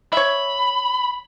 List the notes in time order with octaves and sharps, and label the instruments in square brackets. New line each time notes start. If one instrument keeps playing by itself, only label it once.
[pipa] C#5 E5 [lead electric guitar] B5